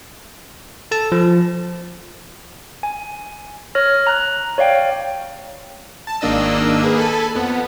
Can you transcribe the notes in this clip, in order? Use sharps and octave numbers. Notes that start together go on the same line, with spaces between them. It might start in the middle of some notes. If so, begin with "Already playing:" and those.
A4 A5
F3
G#5
C#5 F6 A#6
A#5 F#6
C#5 D5 F5 G5
A5
G#1 D#3 A#3 D4 D#5 E6
A#3 G#4 B4
A4 G#5 A5 B5
F2 B3